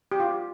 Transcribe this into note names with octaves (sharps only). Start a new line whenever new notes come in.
G4
F4